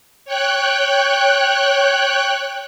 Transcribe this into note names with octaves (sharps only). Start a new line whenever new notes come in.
C#5 G5 F#6